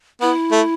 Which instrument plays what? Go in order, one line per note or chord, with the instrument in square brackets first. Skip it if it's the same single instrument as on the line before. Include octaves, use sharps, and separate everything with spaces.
[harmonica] B3 [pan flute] E4
[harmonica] A3